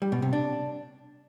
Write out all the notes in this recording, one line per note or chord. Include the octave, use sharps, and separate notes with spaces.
G3
B2
C3
D4